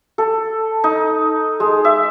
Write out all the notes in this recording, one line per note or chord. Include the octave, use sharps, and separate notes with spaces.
A4
D#4
G#3
E5